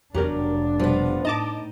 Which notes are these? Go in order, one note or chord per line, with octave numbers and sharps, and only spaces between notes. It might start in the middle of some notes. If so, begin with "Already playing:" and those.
F1 E2 F#3 D4 G4 A#4
B2 F3 G3 B3
A2 D#4 D#5 A5 D6